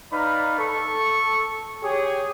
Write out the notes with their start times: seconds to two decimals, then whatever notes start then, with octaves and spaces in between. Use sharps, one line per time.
0.12 D#4 B4 D5 F5 A#5 B5
0.58 A4 C#6
1.83 G4 G#4 C#5